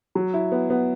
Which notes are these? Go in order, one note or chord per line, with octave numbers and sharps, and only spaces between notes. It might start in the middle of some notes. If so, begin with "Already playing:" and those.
F#3
E4
B3
B3